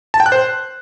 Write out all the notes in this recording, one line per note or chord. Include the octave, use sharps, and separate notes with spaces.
A5
G5
F#6
C5